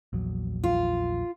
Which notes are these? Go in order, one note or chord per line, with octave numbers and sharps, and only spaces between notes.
A#1 E2 F#3
F4